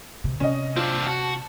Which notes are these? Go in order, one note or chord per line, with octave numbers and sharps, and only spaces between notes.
C3
C3 C#4 D#5
C4 D4 F4
F#4 A5